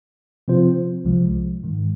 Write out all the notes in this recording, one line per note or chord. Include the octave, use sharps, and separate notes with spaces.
C3 F3 C4 F4 C5
C2 C3 F3 G#3
G#2 D#3 G#3